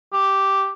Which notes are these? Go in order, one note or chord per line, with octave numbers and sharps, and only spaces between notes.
G4